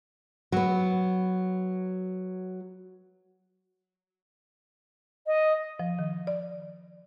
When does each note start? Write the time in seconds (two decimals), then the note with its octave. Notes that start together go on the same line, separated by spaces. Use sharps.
0.52 F#3 B3
5.27 D#5
5.80 F3
5.99 D#3
6.27 D5